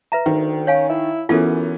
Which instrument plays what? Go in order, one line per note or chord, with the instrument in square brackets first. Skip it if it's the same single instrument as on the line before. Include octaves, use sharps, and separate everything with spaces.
[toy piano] B4 E5 A#5
[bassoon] D2 [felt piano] D#3
[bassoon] C#4 [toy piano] C#5 F5 G#5
[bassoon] E4
[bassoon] F#2 [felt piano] E3 B3 C#4 [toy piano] F4 A4